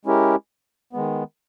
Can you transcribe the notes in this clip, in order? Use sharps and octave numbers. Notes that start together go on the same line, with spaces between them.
G#3 C#4 E4 G4 A#4
D#3 G#3 B3